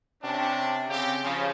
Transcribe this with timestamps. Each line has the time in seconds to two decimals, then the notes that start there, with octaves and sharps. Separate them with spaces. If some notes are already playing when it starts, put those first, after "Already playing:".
0.23 C3 C#4 D4
0.90 C#3 C4 G4
1.23 C#3 F3